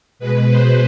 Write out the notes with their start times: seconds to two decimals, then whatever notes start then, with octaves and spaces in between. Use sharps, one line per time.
0.19 B2 G#3 B4
0.48 C5